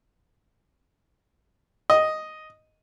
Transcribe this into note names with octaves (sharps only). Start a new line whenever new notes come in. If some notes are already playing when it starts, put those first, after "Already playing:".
D#5